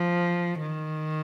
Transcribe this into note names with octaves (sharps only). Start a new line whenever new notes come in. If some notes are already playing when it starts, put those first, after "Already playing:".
Already playing: F3
D#3